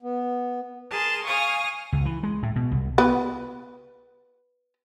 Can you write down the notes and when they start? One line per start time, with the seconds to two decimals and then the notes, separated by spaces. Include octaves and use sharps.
0.03 B3
0.90 G#4 A#4 A5 C6
1.26 F5 G#5 C#6 D#6 F6
1.92 C#2
2.06 E3
2.23 G#3
2.43 A2
2.56 B2
2.72 C2
2.98 B3 B4